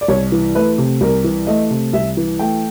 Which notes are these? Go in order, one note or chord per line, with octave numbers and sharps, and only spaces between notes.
D5
C2 C#5
E3
A3 B4
C3
C2 A#4
E3
A3 D#5
C3
C2 E5
E3
A3 G5